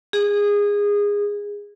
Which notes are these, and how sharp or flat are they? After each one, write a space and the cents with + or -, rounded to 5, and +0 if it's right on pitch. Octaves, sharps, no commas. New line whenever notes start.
G#4 -20